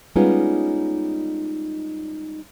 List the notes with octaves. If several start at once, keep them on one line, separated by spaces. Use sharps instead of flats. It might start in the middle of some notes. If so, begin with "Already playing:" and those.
G3 G#3 B3 C#4 D#4 F4